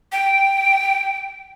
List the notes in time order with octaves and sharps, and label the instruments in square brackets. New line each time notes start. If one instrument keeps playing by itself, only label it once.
[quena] G5